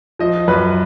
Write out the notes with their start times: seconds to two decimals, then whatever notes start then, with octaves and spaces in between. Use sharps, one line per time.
0.19 F3 D#5
0.48 F#2 B4